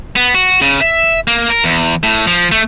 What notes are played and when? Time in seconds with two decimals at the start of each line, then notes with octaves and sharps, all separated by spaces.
0.16 B3
0.35 F#4
0.62 C#3
0.81 E5
1.27 A#3
1.50 A#4
1.64 E2
2.03 A2
2.27 F3
2.52 A3